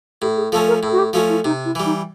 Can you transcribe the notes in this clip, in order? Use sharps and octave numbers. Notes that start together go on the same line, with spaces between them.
A2 G4
G#4
F3 A3 C#4 A4
A#4
A2 A4
F#4
G4
F3 A3 C#4 F#4
E4
C3 D#4
E4
E3 G3
D#4